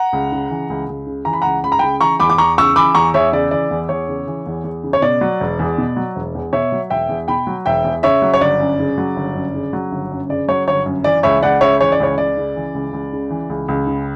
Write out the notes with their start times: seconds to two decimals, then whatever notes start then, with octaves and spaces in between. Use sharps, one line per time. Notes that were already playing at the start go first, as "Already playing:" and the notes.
Already playing: F#5 A#5
0.13 C#2
0.32 C#3
0.50 E3
0.70 C#2
0.89 C#2
1.07 C#3
1.25 E3 A#5
1.33 B5
1.42 C#2 F#5 A#5
1.63 C#2 B5
1.72 A#5
1.79 C#3 G5 B5
2.01 E3 A#5 C#6
2.20 E2 B5 D6
2.30 D6
2.38 E2 A#5 C#6
2.58 C#3 C#6 E6
2.76 E3 B5 D6
2.95 E2 A#5 C#6
3.14 E2 C#5 E5
3.32 C#3 D5
3.51 E3 D5
3.71 E2
3.89 E2 C#5
4.08 C#3
4.27 E3
4.46 E2
4.64 E2
4.84 C#3
4.93 C#5
5.02 B2 D5
5.21 F#3
5.40 E1
5.59 E2
5.78 B2
5.96 F#3
6.16 E1
6.35 E2
6.52 B2 C#5 E5
6.72 F#3
6.90 E1 E5 G5
7.09 E2
7.28 B2 G5 B5
7.47 F#3
7.66 E1 E5 G5
7.84 E2
8.03 C#3 C#5 E5
8.22 F#3
8.34 C#5
8.41 G1 D5
8.60 F#2
8.79 C#3
8.98 F#3
9.16 G1
9.35 F#2
9.54 C#3
9.73 F#3
9.92 G1
10.11 F#2
10.29 C#3 D5
10.48 F#3 C#5
10.68 G1 C#5
10.86 F#2
11.04 E3 D5
11.23 C#2 C#5 E5
11.42 C#2 D5 F#5
11.61 C#3 C#5 E5
11.81 E3 C#5
11.92 D5
12.00 C#2 C#5
12.17 C#2 D5
12.37 C#3
12.56 E3
12.75 C#2
12.93 C#2
13.12 C#3
13.30 E3
13.49 C#2
13.68 C#2
13.87 C#3